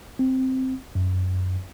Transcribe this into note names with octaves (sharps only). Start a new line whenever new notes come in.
C4
F#2